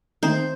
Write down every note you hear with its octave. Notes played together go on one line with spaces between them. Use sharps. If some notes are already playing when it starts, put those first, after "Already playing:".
D#3 A3 C4 D#4 C5